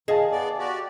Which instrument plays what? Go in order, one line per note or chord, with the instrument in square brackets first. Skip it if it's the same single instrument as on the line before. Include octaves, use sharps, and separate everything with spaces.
[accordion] D#3 [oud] G#4 [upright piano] D#5 F5 A5
[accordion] B3 D5
F#4 G4 D5